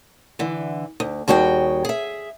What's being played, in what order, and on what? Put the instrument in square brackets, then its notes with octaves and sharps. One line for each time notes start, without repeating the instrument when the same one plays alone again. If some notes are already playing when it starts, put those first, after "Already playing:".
[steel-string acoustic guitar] D3 E3
D2
D#2 G3 F#4 G#4 G5
G#4 E5